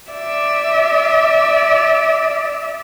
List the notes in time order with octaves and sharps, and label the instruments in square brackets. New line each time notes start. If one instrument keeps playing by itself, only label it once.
[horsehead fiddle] D5 E5